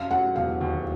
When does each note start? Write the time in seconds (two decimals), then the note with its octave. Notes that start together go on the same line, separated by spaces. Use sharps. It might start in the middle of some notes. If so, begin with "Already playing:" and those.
Already playing: F#2 F5
0.11 F#3 F#5
0.36 E1 F5
0.61 D#2